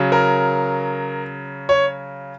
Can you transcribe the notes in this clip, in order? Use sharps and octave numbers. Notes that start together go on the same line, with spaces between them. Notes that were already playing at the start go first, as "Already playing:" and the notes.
Already playing: C#3 F#3
A#4
C#5